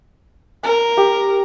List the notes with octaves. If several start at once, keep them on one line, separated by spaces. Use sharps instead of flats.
A#4
G4